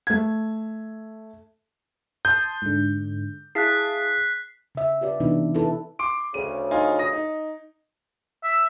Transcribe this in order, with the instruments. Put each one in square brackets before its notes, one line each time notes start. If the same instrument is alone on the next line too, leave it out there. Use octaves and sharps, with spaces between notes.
[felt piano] A3 G#6
[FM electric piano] A5 C6 D#6 [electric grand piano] G6
[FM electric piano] G#2 D3
[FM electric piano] E4 F5 A5 [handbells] G#4 [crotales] F#6 B6 C7
[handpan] C#3 E5
F4 G4 B4 D5
C3 E3 B3 D4 D#4
E4 A4 B4
[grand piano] C6 D6 D7
[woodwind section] D2 C#3 [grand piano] D#7
[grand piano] D#4 F4 G#5
D#6 A#6
D#4
[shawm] E5